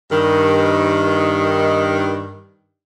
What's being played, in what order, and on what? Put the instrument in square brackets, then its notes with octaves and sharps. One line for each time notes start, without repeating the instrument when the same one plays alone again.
[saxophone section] G2 D#3